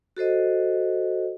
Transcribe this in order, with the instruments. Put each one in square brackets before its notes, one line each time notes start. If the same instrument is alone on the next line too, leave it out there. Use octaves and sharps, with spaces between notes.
[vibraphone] F#4 A4 C5 D#5